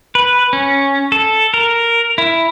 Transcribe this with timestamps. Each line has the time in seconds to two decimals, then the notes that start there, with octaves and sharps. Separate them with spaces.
0.15 B4
0.53 C#4
1.12 A4
1.54 A#4
2.18 E4